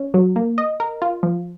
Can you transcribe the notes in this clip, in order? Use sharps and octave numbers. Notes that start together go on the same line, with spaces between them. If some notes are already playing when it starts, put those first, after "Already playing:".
Already playing: C#4
F#3
A#3
D#5
A#4
F4
F3